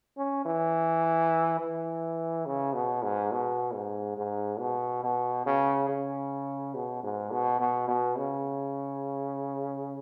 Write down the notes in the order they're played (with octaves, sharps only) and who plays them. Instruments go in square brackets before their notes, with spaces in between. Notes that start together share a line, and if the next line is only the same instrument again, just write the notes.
[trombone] C#4
E3
E3
C#3
B2
G#2
B2
G#2
G#2
B2
B2
C#3
C#3
B2
G#2
B2
B2
B2
C#3